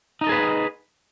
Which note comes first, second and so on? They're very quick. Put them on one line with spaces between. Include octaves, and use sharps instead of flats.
D#4 D#5 A4 G#4 B4